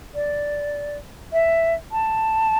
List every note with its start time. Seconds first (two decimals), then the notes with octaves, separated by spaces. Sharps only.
0.15 D5
1.33 E5
1.92 A5